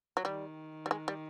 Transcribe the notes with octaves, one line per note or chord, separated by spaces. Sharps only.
F#3
D#3 G3
G3
G#3
G3